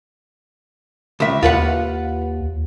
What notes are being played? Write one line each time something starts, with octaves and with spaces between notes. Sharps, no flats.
C#2 E5
D#2 F4 B4 F#5